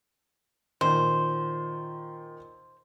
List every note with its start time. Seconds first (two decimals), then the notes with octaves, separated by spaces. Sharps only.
0.81 A#2 D#3 C5